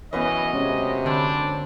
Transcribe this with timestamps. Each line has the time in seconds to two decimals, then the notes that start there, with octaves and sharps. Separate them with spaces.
0.13 F#2 E3 B3 B4 C#5 D#5 F#5
0.53 C3 G#3 C#4 C#5
1.06 D3 C4 D4 B5